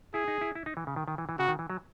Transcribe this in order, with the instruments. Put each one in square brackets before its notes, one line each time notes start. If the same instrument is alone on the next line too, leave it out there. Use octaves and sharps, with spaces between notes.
[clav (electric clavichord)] E4 [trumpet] G#4
[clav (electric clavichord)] D#4
E4
E4
D#4
E3
C#3
D#3
D#3
E3
E3
[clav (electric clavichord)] C#3 [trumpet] F#4
[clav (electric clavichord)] D#3
E3
F#3